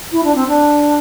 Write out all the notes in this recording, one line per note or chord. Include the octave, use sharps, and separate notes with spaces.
E4
D4
C4
D4